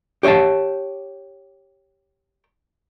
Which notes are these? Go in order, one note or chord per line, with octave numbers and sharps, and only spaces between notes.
G4 C#5 D#5 E5 A5